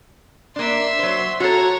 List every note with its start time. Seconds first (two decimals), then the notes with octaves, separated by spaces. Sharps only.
0.56 A#3 D4 E5 C6
0.99 F#3 C5
1.40 F#4 A4 C#5 A#5